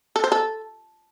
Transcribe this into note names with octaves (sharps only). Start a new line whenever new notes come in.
A4
C5
A4